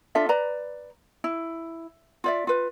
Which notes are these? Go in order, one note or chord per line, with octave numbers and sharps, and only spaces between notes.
D4 F4 A4 E5
B4 D5 A#5
E4
F4 D5 E5
F4 B4